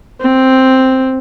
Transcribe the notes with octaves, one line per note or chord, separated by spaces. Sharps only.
C4